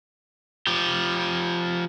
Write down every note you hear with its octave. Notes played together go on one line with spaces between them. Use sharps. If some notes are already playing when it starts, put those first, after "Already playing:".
F3 G4